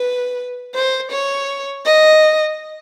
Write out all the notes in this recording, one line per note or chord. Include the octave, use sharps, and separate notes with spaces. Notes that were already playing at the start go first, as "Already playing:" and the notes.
Already playing: B4
C5
C#5
D#5